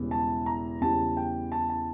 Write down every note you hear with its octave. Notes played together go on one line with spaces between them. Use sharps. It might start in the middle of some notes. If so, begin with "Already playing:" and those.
Already playing: E1 E2 C#3 E3 G3
A5
A#5
E2 C#3 E3 G3 A5
G5
A5
A5